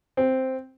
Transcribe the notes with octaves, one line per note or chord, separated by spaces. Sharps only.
C4